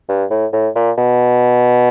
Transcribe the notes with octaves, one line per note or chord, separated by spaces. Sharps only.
G2
A2
A2
A#2
B2